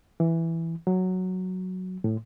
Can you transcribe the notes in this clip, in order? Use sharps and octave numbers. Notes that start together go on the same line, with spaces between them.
E3
F#3
A2